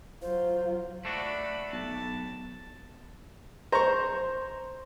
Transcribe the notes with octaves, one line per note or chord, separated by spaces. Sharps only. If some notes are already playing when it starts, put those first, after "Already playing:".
F#3 F4 C5
A3 D4 F#4 D5 B5
B1 A5
C5 A#5 C#6